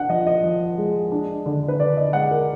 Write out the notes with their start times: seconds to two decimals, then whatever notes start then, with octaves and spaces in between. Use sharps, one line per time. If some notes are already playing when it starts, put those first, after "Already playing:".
Already playing: D4 F#5
0.09 F3 D#5
0.27 D#5
0.43 F3
0.78 G#3
1.12 D4
1.46 D3
1.68 B4
1.79 D3 D5
1.97 D#5
2.13 G#3 F#5
2.31 A#4